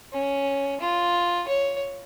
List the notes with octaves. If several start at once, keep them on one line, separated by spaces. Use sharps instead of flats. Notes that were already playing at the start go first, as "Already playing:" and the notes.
C#4
F4
C#5